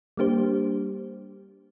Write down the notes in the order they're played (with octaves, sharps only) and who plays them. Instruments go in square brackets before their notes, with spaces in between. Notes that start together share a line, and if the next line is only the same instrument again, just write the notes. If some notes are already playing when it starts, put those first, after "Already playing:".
[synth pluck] G3 A#3 D4 G4 C5